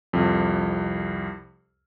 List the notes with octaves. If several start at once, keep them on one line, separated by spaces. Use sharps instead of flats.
C2 F2